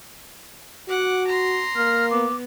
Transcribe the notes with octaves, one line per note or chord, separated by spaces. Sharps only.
F#4 F#5 D6
A#5 C6
A#3 F6
B3 D6